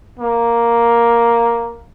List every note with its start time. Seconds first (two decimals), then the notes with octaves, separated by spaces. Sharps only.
0.19 A#3